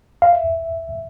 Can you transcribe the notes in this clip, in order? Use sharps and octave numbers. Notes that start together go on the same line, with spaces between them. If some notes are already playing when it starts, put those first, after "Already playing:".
F5
E5